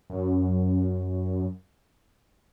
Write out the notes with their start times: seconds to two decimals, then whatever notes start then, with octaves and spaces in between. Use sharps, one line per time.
0.10 F#2